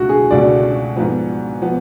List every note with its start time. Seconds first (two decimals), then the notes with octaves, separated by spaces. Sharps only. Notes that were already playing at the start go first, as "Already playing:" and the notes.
Already playing: C#2 B2 A3 F#4
0.09 G#4
0.31 C#2 B2 A3 D5
0.96 G#2 F3 B3
1.62 F3 B3